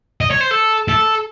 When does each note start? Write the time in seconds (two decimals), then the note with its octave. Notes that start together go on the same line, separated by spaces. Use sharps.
0.21 D#5
0.31 C#5
0.41 C5
0.51 A4
0.88 A4